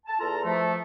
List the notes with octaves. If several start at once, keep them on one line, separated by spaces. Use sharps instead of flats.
A5
E2 F4 A4 A#5
F3 A3